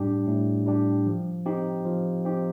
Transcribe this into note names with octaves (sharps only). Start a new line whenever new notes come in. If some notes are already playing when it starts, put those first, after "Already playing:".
Already playing: A2 G3 D4 G4
A2
G3 D4 G4
F3
C4 D#4 G4
F3
C4 D#4 G4